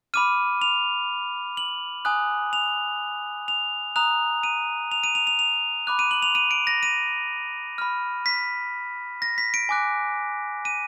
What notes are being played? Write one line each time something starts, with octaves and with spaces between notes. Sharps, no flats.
B5 D6 F6 D#7
F7
F#7
G#5 D#6 F#6
F7
F7
A#5 D#6 F#6 F7
D#7
F7
D#7
F7
F7
F7
B5 D6 F#6
D#7
F#7
F7
D#7
D7
A#6
D#7
B5 F6
B6
A#6
B6
D7
G#5 D6 F#6
D#7